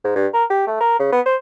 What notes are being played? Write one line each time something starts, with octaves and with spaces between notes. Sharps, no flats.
G#2
G2
A#4
G4
A3
A#4
C#3
B3
C5